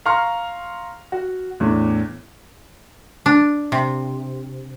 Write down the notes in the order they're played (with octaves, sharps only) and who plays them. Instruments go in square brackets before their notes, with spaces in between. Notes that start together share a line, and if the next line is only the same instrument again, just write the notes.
[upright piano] F5 A#5 C6 C#6 F6
F#4
E2 A2 D4
[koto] D4
C3